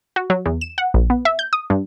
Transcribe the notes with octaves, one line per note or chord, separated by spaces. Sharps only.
F#4
F#3
E2
E7
F#5
A#1
B3
E5
G6
D#6
G2